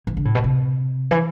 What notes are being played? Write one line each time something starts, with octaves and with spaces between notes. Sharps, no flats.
E3
D3
A2
B2
C3
E3